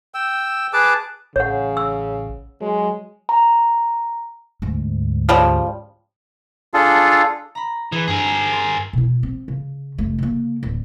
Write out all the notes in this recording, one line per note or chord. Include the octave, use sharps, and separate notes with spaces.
G5 E6
G#4 B4 A5 D6
A1 C#3 C#5 F#5
E6
F#3 G#3
A#5
D2 G#2
C#3 F3 G3
D4 F4 G#4 A4
A#5 B5
E3 G#4
G2 G#4 A#4
C6 A6 D#7
B2 E4
C4
C#3
F1 A3
C#3 A#3
D1